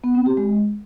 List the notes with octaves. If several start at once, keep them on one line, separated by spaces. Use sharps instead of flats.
B3
C4
G4
G#3